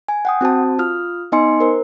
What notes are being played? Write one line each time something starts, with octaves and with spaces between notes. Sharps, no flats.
G#5
F#5 G5 D#6
C4 F#4 C5 A5
F4 D#6 F6
B3 D#4 D#5 G#5 C6 C#7
A#4 C5